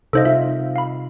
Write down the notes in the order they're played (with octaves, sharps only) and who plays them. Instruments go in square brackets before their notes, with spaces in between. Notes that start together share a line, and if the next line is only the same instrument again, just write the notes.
[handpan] C3 D#4 F5 [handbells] A4 C5 D#5
[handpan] F4 [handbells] E5
[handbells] F5 B5